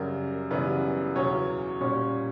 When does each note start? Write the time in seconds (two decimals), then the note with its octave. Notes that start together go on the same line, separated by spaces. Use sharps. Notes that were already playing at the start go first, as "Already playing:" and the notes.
Already playing: F#2 C#3 G3 A#4
0.51 F#2 C#3 E3 G3 B3 B4
1.16 E2 C#3 F#3 C#4 C#5
1.81 A#2 G3 C#4 C#5